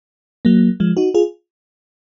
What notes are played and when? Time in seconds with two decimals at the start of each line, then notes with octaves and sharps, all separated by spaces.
0.45 F#3 A#3
0.80 F3 G#3
0.97 D#4 F#4
1.14 F4 G#4